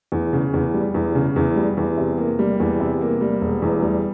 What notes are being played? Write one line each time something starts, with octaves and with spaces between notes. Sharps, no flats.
E2
C#3
E2
G3
E2
C#3
E2
G3
E2
C3
A#3
G3
E2
C3
A#3
G3
E1
E2
G3